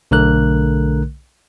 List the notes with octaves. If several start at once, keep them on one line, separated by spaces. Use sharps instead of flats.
B1 D3 A3 A#4 F#6